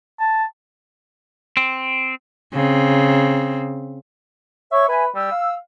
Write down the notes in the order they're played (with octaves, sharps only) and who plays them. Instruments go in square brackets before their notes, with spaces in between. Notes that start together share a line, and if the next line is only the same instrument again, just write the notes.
[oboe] A5
[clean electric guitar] C4
[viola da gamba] C#3 C4
[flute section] C#5 C#6 [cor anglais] E5
[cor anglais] B4 [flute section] E5 G#5
[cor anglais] G3 [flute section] E6
[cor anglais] F5